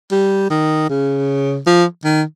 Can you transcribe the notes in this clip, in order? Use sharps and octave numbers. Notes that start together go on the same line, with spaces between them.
G3
D#3
C#3
F3
D#3